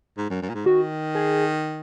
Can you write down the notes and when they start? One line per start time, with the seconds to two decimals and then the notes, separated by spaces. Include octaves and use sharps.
0.18 G#2
0.30 F#2
0.42 F#2
0.49 A#2
0.54 G#2
0.66 D#3 F#4
1.15 G#4